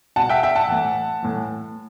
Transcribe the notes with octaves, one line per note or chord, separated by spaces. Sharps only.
B2 F#5 A5
E5 G5
E5 G5
F#5 A5
A2 E3
A2 E3